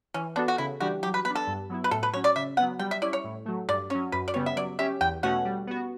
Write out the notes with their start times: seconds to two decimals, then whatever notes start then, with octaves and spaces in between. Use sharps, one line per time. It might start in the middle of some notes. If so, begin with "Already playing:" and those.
0.14 E3 C#4
0.36 B3 D4 F#4 A4
0.48 F#4
0.58 C#3 E4
0.80 E3 G3 D4 F#4 G4
1.03 F#3 G4
1.14 B4
1.25 B3 D4 B4
1.35 A4
1.47 G2
1.69 F#3 B3 E4
1.84 B4
1.91 A2 A4
2.03 B4
2.13 F#3 C#4 C#5
2.24 D5
2.36 C#3 E5
2.57 F#3 B3 F#5
2.79 G3 G5
2.91 E5
3.02 C#4 E4 D5
3.13 C#5
3.24 A2
3.45 F#3 A3
3.68 G2 D5
3.90 F#3 C#4 C#5
4.12 F#2 B4
4.28 D5
4.34 C#3 G3 B3 C#5
4.46 E5
4.56 F#3 D5
4.79 C#4 G4 E5
5.01 E2 G5
5.23 B2 A3 C#4 F#4 F#5
5.45 G3
5.67 B3 F#4